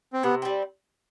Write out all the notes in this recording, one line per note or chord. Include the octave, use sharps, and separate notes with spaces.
C4
C3 B3
G3 C4